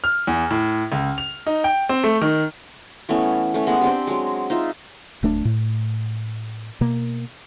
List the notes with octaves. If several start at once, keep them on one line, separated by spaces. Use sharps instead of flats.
F6
E2
A2
C#2
F7
D#4
G5
C4
A3
D#3
E3 A3 B3 C#4
A3 C#4
G#3 B3 D#5 F#5
C4 D4 G4
F#3 G#3
D#4 F4 E5
D1 A3 D4
A2
B2 A#3